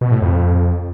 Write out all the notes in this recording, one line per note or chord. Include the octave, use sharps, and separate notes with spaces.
B2
A2
F2